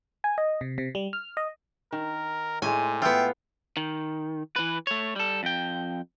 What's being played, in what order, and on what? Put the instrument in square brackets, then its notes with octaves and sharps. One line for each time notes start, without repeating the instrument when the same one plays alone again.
[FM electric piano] G#5
D#5
C3
C3
G3
F6
D#5
[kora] D#3 [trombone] A#4
[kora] A2 G#3 [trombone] C3 [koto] G#5
[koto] B3 F4 [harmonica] E5 G5
[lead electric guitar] D#3
E3 B4
A3 C#5
G3 A4
F2 G5